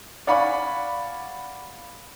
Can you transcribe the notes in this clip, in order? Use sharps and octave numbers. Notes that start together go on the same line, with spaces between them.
D5 F5 F#5 G#5 B5 C#6